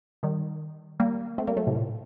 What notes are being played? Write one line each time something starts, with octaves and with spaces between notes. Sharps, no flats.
D#3 G3
G3 A#3
A3 C4
G3 A#3
F#3 A3
A2 C3
A#2